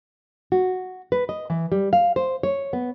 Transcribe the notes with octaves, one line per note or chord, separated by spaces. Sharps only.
F#4
B4
D#5
E3
G3
F5
C5
C#5
B3